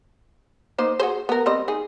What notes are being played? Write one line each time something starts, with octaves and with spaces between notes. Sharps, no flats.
A#3 D#4 C5
F#4 G#4 C5
B3 A#4
G3 C4 D#5
D#4 G#4